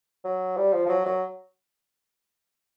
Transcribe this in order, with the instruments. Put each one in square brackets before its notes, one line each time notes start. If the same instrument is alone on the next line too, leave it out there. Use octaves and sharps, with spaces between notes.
[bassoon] F#3
G3
F3
F3
F#3
F#3